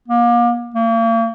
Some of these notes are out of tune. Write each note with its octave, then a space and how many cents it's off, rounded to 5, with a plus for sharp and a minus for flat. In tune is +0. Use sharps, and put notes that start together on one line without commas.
A#3 +35
A#3 -40